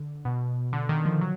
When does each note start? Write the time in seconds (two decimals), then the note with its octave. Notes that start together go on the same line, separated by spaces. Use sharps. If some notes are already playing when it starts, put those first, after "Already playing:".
Already playing: D3
0.25 B2
0.73 D3
0.89 D#3
1.05 F3
1.21 F#3